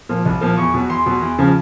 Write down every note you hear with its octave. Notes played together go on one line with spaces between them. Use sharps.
A#2 F3
C2
A#2 F3
E2 C#6
B2 F#3
E2 C6
B2 F#3
E2
C#3 F3